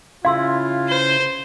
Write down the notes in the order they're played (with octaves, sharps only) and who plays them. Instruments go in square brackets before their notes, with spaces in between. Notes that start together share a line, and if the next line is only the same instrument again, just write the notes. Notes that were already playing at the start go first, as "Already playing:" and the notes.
[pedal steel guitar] C#3 E4 [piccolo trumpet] F4 [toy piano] F5 C6 E6
[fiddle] C5